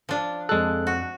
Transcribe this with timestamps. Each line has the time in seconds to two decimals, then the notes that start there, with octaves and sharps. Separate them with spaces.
0.09 F3 D4
0.49 F2 G#3 A4 F#6
0.87 F#4